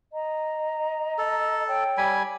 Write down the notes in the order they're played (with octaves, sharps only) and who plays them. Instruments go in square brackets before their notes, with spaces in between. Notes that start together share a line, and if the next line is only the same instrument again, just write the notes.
[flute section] D#5 A#5
[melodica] A4
[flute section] C#5 G5
[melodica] G3 G#5 B5